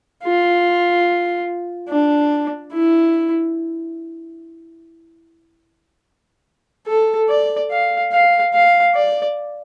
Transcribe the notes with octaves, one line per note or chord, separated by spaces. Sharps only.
F4
D4
E4
A4
D5
F5
F5
F5
D5